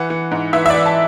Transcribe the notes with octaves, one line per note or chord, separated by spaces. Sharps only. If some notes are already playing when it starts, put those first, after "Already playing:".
Already playing: E3 F#5
E3
G#2
E3 E5
E5
E3 D5
A5